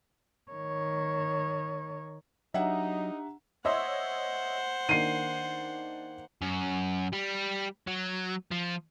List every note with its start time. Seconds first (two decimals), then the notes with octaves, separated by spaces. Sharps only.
0.52 D#3 C#5
2.54 F#3 D4 D#4 G4 E5 F#5 A#5
3.65 C5 C#5 D#5 E5 F#5 C6 E6
4.89 D#3 A#3 D4 C7 D#7
6.41 F#2
7.13 G3
7.88 F#3
8.52 F3